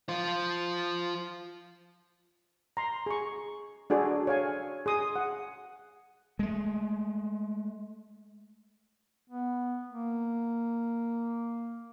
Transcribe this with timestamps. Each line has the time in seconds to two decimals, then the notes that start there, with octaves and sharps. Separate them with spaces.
0.09 F4 C5
2.77 A#5 C6
3.06 G#4 C#6
3.90 D4 F#4 G#4 A4 D5
4.27 C#5 F5 G#5
4.86 G#4 C6 D#6
5.16 F#5
6.39 G#3 A3
9.30 B3
9.90 A#3